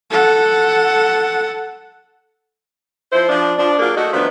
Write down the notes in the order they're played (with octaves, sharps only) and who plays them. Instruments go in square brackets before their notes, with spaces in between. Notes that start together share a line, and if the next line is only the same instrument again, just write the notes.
[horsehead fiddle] A4 F#5
[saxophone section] F3 E4 C5
F3 D4
F3 D4
F#3 A#3 D4 F4 G#4
A3 D#4 F#4
D#3 F3 A3 B3 D4